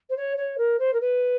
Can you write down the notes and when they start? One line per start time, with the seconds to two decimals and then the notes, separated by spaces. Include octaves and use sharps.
0.09 C5
0.16 C#5
0.37 C#5
0.57 A#4
0.79 C5
0.93 A#4
1.01 B4